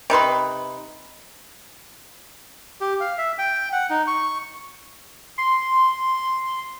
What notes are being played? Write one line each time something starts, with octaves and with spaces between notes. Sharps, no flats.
C3 D#4 B4 C6
G4
F5
E5
G5
F#5
D#4
C#6
C6